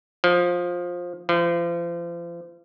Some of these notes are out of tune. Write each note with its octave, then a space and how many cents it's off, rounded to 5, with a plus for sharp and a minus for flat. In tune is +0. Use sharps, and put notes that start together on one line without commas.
F3 +15
F3 -35